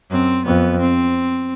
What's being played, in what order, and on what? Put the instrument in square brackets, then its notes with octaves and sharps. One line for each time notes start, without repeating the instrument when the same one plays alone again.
[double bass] F#2 [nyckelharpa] C4
[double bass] F2 [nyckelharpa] B3
[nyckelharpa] C4